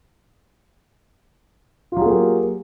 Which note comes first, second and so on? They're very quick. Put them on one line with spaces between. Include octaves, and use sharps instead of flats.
F4 F#3 G#4 A#3 G4